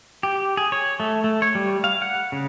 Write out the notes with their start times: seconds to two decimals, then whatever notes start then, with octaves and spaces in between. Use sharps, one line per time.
0.23 G4
0.57 G#4
0.72 C#5
1.00 A3
1.24 A3
1.42 C#5
1.55 G3
1.84 F5
2.02 F#5
2.32 C#3